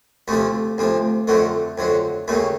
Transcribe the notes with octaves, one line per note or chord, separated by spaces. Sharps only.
D2 C3 F3 A3
D2 C3 F3
F2 D3 F#3 A3
F2 D3 F#3
D#2 C#3 F#3 A3